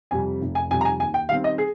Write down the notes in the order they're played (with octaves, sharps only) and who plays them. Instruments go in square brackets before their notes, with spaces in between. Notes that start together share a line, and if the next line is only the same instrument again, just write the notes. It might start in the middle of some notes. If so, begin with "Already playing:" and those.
[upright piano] F2 C3 G3 G#5
F1
G#5
F2 C3 G3 G#5
A#5
G#5
D#2 G#5
G5
D#3 G3 C4 F5
D#5
G#4